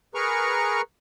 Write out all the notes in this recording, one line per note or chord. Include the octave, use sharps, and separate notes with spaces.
G#4 A#4 B4 A#5 C#6 F6